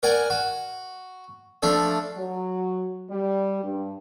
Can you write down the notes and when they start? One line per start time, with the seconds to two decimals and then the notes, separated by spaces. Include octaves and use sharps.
0.03 A#4 D5 F#5 G#5
0.30 F#4
1.62 F3 A3 D4 A4
2.17 F#3
3.10 G3
3.64 G2